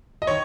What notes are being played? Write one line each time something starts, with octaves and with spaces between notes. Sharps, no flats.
D#5
D#3 C#5